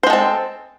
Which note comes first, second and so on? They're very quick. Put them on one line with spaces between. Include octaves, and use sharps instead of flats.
C5 G#3 A4 C4